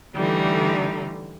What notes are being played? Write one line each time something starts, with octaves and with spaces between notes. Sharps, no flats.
D3 E3 G3 A3 D#4